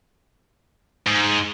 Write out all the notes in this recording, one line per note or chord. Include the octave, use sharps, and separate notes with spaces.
G#2